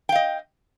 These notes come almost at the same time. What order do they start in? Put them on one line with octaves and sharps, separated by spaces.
G5 F5 D#5